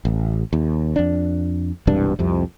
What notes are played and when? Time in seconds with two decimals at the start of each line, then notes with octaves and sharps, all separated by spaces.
0.05 A1
0.53 D#2
0.96 F2 D4
1.87 E1 C2 G2 D4
2.19 C2 F2 C3